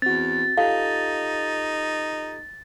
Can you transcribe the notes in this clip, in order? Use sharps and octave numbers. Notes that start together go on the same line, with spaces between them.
E2 C4 F#4 A6
D#4 F4 G4 A4 F5